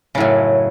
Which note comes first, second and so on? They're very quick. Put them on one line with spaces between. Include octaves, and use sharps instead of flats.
C#3 A2 F#2